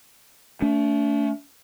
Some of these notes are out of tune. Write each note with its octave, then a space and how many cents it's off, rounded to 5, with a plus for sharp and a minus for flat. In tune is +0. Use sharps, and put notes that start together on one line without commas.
A3 +10 D4 -45